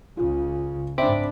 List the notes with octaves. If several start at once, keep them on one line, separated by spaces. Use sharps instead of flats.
C#2 C#3 F4
G#2 C4 D4 E5 B5 D6